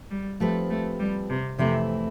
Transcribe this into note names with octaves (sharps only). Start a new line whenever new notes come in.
G3
F3 A3 C4 G4 B4
A3
G3
C3
F2 C3 E3 A3 C4 E4